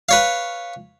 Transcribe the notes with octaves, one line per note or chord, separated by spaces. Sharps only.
B4 C#5 F5